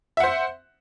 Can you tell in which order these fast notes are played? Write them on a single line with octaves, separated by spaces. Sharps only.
E5 F#5 C5